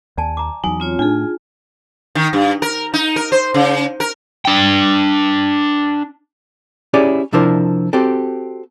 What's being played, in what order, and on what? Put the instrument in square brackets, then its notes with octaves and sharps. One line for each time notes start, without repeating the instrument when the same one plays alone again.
[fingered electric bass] D#2 [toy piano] D5 G#5 A5
[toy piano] A#5 D6
[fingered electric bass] E2 F#3 [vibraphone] D#4 [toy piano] G#5
[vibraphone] C4 F4 C#5
[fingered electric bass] A2 [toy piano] D4 D#4 [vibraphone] F4 G#4
[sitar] D#3
G2
A#4
D#4
A#4
C5
C#3
A#4
[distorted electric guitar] D4 G5
[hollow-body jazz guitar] C#4 E4 G4 G#4 C#5 D5
C3 F3 D4 E4 A#4 C5
C4 F#4 G4 A4